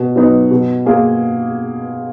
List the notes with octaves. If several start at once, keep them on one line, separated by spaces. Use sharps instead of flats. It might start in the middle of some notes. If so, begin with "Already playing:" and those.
Already playing: B2
F#3 B3 D#4
B2
A#3 F4 G#4